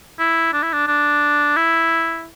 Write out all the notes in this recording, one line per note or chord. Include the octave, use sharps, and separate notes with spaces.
E4
D4
E4
D4
D4
E4